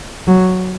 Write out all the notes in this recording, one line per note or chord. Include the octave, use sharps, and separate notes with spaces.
F#3